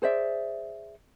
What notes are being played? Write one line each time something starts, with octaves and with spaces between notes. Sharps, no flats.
G#4 C5 D5 E5